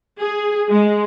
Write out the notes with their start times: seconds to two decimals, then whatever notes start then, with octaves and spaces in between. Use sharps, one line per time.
0.20 G#4
0.69 G#3